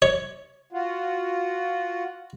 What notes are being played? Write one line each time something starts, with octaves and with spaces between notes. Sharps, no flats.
C#5
F4 F#4